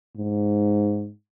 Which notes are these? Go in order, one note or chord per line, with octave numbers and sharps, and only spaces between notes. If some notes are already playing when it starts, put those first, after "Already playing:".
G#2